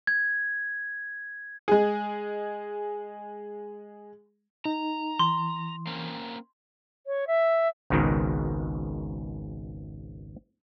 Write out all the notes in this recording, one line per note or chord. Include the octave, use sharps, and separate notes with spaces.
G#6
G#3 G#4
D#4 A#5
E3 C6
A#3 C4 C#4
C#5
E5
G#1 C#2 G#2 B2 D#3